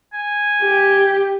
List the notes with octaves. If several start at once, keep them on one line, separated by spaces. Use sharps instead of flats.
G#5
G4